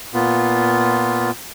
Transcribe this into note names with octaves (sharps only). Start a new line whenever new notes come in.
A#2 B3 F4